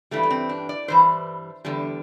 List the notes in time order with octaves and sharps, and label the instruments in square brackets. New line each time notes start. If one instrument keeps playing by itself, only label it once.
[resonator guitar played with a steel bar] G2 E3 G3 A3
A3
C4
D4
D5
G2 E3 G3 C5
E2 D3 G3